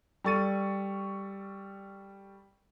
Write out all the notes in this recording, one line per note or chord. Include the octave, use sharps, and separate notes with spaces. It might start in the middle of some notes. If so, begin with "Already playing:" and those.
G3 A4 C#6 A6 D#7